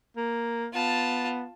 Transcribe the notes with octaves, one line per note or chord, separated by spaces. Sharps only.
A#3
B3 F4 A5